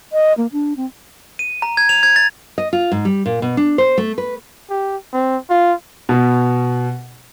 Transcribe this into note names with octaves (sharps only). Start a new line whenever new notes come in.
D#5
A#3
D4
C4
D#7
A#5
G#6
F7
G#6
A6
D#5
F4
G#2
G3
A#2
B2
D4
C5
A3
B4
G4
C4
F4
B2